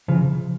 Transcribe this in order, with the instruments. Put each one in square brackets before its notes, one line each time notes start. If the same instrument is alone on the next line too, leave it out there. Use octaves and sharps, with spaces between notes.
[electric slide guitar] C#3 [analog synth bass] F3